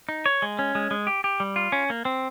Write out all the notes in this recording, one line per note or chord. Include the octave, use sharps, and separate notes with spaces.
D#4
C#5
G#3
C#4
G#3
G#3
G4
G4
G3
F4
C#4
A#3
C4